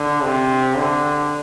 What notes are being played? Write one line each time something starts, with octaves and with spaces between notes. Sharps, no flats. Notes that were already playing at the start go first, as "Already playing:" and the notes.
Already playing: D3
C3
D3